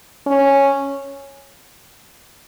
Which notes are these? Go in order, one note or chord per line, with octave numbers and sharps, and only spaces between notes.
C#4